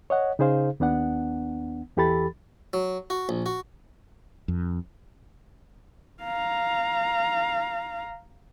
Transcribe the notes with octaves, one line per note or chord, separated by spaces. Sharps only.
C#5 D#5 F#5
C#3 D#4 G#4 C5 F5
D#2 B3 D4 F#5
E2 E3 G4 A4 B5 A6
F#3
F#4
A#1
F#4
F2
F5 A#5